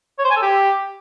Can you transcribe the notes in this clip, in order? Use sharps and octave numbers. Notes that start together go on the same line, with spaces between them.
C#5
C5
G#5
A4
G4